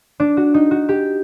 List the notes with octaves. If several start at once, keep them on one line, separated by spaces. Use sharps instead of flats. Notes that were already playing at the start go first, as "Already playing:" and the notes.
D4
F#4
D#4
F#4
G4